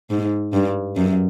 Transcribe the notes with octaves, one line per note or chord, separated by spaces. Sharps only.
G#2
G2
F#2